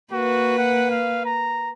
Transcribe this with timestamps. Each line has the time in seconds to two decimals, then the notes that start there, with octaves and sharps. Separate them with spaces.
0.13 A#3 F#4 B4
0.58 F#5
0.91 F5
1.25 A#5